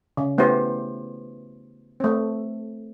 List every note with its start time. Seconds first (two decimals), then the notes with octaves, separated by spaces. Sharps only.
0.17 C#3
0.38 A3 B3 E4 G4 C5
2.00 A3 C4